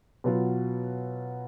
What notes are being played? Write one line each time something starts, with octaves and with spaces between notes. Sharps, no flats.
B2 F#3 B3 F4